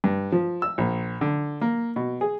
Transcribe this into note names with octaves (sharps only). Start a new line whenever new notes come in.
G2
F3
E6
A#1
D3
A#3
B2
G#4